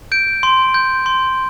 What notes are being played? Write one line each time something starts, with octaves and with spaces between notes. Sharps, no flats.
G6 D7
C6
G6
C6